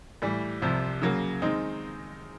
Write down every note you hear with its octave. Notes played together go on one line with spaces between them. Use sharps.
A2 E3 G3
C2 C3 F3
C#3 F#3 A#3
D#3 G#3 C4 D#4